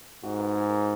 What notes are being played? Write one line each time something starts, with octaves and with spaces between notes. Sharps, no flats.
G#2 F#4
B4
G#4
A#4